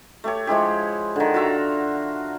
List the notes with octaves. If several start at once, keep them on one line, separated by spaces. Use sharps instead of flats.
A3 G4 C#5
F3 G#3 E4 G4
D3 D#3
F4 F#4 E5 A#5